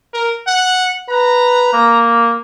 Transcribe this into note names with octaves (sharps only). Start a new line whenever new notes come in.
A#4
F#5
B4 A#5
A#3